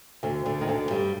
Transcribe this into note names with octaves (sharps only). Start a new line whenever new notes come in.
D2 D3
D2 D3
D#3
D2 D3
G2 G3